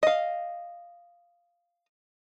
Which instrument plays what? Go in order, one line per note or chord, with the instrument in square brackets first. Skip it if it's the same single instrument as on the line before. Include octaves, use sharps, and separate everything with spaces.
[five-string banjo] D#5 F5